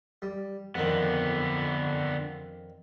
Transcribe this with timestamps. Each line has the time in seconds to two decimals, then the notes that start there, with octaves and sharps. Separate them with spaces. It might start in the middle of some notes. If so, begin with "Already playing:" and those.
0.22 G3
0.75 F2 D3 D#3 B3